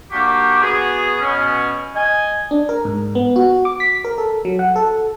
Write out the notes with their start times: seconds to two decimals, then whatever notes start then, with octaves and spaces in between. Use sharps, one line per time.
0.12 A#3 D4 F#4 G4
0.62 B3 F#4 G#4
1.21 B2 C#4
1.95 D#5 G#5
2.51 D4
2.69 A#4
2.85 G#2
3.15 B3
3.36 F#4
3.65 D6
3.80 B6
4.05 A#4
4.18 A4
4.45 F#3
4.59 F#5
4.76 A4